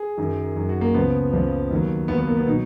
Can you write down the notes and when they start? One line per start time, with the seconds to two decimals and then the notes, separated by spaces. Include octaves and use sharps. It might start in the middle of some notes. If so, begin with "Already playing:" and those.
Already playing: G#4
0.17 F#2 D#3 F#3
0.56 F#2 D#3 F#3
0.69 F#4
0.81 A#3
0.94 C#2 C#3 F3 B3
1.33 C#2 C#3 F3
1.70 D#2 D#3 F#3
2.08 D#2 D#3 F#3 B3
2.18 B3
2.27 A#3
2.37 B3
2.47 B2 F#3 D#4